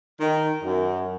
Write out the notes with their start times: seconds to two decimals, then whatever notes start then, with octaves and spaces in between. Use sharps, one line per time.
0.20 D#3
0.63 F#2